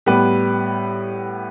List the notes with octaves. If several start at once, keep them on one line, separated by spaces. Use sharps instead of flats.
A2 G3 B3 G4 B4